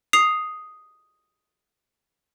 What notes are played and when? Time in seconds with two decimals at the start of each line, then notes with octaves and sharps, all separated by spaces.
0.13 D#6 C7 F7